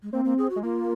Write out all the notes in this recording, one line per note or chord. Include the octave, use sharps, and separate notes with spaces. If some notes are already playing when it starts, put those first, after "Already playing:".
G#3
A#3 C4
A#3
G#4
F#4
G#3
A#3 F4